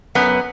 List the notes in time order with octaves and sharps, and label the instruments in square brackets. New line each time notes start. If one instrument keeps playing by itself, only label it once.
[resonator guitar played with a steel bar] F#2 B3